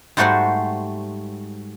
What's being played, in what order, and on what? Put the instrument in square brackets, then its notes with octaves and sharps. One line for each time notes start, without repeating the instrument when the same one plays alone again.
[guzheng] G#2 G3 A3 F#4 C5 F#5